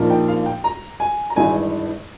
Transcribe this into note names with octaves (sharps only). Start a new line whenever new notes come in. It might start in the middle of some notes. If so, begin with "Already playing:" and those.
Already playing: A#1 G#2 F3 A#3
G5
F5
G5
A#5
G#5
A#5
G#1 G2 E3 G#3 G#5